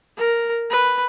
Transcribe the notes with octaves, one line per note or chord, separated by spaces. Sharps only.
A#4
B4